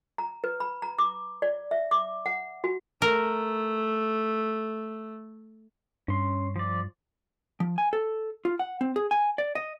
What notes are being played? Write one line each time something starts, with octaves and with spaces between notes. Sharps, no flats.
A#5
B4
B5
A#5
D6
D5
E5
D6
F#5
F#4
A3 A#4
G2 C#4 C6
F3 D5
F3
G#5
A4
F4
F#5
C4
G#4
G#5
D5
D#5